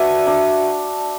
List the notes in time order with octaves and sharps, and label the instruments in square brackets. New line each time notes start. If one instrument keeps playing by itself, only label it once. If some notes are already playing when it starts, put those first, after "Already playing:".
Already playing: [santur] D4 F#4 B4 E5
D4